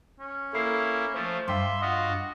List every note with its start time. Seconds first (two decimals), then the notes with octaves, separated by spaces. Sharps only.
0.20 C#4
0.53 A#3 E4 A4 C7
1.14 F3 A3 C5
1.48 G2 E5 F5 G5 C6 D6
1.82 F4 F#4 D#5